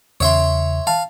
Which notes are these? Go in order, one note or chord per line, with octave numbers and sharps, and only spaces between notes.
E2 C#3 C#5 E5 C6
F5 A5